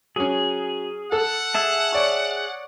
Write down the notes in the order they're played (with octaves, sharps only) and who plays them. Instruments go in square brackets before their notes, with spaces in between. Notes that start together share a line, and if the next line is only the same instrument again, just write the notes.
[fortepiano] F#3 C#4 [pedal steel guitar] G#4
[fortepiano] A4 [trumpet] F#5
[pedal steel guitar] G#4 E5 A5
[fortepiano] C#5 D5 C#6